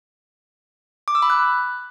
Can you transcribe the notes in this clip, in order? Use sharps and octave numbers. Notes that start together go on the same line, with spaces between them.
D6
E6
B5
F#6